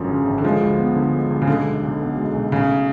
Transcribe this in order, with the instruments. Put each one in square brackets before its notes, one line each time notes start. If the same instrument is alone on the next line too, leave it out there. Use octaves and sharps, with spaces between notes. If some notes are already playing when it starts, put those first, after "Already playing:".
Already playing: [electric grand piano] G#1 F#2 F3 [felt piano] D3
[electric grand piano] C#3
G#1
[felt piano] D3
[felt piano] F3 [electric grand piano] G#3
[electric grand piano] D2
B3
D3
G#3
D2
[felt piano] C#3
[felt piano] D3 [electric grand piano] G#3
[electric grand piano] B1
B1
B2
G#3
B1
[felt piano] C#3 [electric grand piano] A3